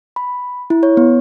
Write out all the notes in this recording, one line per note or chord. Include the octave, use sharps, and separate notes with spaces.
B5
E4
C#5
B3